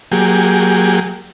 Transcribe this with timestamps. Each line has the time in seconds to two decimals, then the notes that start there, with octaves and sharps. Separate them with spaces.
0.12 F#3 A#3 G4 G#4